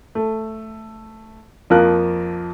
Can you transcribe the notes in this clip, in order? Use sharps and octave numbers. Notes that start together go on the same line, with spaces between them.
A3
F2 F3 A#3 A#4 F#6